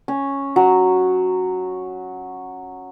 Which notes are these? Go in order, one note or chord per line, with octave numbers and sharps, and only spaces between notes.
C#4
F#3